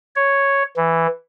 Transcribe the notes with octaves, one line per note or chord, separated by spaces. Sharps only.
C#5
E3